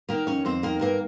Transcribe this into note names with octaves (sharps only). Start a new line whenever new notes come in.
D#3 A#3 A#4
F2 C#4 C#5
F2 C4 C5
D#3 A#3 A#4
G2 A#3 A#4